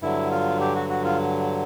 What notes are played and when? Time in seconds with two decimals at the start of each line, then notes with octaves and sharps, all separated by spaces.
0.02 G2 D3 F#3 E4
0.31 F4
0.60 G4
0.75 F#4
0.90 F#4
1.05 F4